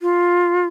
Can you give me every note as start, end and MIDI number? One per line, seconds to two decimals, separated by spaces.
0.01 0.67 65